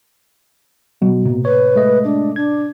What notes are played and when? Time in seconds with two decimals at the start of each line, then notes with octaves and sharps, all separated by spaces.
1.02 B2 F#3
1.25 A2 C3 A#3
1.45 B4 C#5
1.75 G#3 A3 D#5
2.04 D4
2.36 D4 G#6